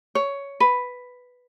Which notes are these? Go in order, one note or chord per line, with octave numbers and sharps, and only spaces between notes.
C#5
B4